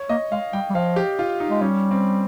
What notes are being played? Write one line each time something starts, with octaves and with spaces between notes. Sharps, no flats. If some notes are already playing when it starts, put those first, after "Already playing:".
Already playing: C#5
A#3 D#5
G#3 F5
G3 G5
G3
F3 F5
G4
F4
D#4
G#3
G3 C#4
C4